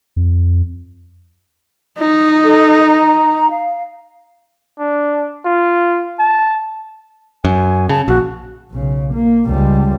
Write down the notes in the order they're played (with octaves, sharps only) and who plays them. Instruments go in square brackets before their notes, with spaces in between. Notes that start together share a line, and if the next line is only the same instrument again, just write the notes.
[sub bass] F2
[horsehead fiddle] D#4
[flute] A4
A#5
F5
[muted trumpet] D4
F4
A5
[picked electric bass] F#2 [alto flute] G#5
[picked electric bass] C#3 [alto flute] A5
[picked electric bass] A#1 [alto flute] F#4
[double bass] B1 C#3
A#3
C#2 G3